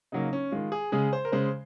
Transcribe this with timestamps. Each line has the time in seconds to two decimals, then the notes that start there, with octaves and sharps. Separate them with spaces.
0.12 C#3 F#3 A#3 D#4
0.33 C#4
0.52 D#3 G#3 F4
0.72 G#4
0.92 C#3 G#3 G#4
1.13 C5
1.25 A#4
1.32 C#3 G#3 C5